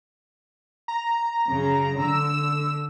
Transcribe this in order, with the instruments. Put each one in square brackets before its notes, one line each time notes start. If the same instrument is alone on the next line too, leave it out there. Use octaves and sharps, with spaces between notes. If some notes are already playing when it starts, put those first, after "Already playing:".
[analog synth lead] A#5
[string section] F#2 C#3
D3 E6